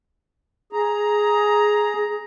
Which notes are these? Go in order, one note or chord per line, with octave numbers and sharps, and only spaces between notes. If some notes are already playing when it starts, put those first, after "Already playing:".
G#4 A#5